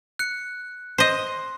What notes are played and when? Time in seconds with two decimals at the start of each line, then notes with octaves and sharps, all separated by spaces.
0.19 F#6 C#7
0.98 C5 D#5 C6